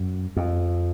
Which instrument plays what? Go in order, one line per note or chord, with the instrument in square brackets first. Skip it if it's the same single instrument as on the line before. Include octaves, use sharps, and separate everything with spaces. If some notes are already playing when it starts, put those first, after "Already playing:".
Already playing: [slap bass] F#2
F2